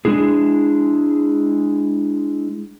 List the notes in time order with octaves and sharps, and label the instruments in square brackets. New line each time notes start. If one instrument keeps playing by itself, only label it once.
[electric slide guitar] G#3 D4 E4 G#4